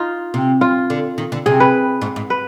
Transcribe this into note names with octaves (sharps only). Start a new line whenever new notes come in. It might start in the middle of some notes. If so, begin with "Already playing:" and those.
Already playing: D#4 F4
C3
F4
D3
D#3
D3
C3 G#4
B4
G#2
G#2
B4